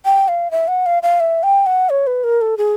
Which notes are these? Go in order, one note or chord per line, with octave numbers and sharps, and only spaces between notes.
G5
F5
E5
F#5
F5
F5
E5
G5
F#5
C#5
B4
A#4
A4
G#4